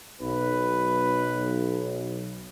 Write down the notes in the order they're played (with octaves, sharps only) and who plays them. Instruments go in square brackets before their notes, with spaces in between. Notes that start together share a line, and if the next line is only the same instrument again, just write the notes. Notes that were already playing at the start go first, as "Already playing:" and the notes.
[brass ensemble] B1 [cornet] B4